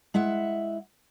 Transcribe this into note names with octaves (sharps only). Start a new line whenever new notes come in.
G#3 E4 E5 F#5